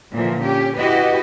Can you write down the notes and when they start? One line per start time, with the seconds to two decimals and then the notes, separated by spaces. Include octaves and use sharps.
0.12 A#2 D3 E3 F3
0.42 C#4 G4
0.77 E4 F#4 G4 B4 D#5